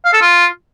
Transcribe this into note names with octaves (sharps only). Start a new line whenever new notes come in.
F5
A4
F4